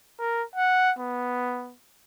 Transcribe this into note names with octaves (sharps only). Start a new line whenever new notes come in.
A#4
F#5
B3